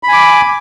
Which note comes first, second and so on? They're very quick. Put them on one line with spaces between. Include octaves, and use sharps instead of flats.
B5 G#5 D6